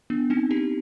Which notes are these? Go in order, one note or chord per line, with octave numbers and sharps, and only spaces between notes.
B3 D4
C4 D#4
D#4 G4